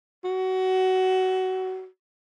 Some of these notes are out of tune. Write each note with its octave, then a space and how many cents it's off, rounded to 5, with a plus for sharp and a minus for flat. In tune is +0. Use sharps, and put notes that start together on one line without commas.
F#4 +20